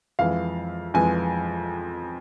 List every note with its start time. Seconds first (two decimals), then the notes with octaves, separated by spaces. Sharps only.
0.19 F2 E3 G#3 F5
0.94 F2 E3 G#3 G#5